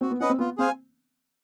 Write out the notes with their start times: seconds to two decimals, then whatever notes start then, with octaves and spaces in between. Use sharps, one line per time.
0.01 C4 F#4
0.10 B3
0.20 C#4 B4 D#5 F#5
0.29 C4
0.39 B3 F4
0.57 C4 G#4 C5 F5 G#5